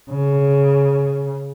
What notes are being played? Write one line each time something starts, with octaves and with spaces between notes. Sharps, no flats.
C#3